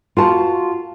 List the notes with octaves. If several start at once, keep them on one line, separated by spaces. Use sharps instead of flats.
F4 F#4 A5